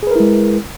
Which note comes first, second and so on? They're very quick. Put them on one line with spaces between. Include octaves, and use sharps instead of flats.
G#4 B4 A#4 E4 G#3